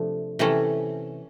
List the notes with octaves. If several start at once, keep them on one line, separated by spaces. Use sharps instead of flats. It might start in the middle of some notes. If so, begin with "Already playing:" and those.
Already playing: C3 F3 A3 D4
C3 E3 A3 C#4